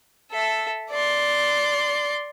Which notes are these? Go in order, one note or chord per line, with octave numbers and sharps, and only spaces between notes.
A4 E5
D5 C6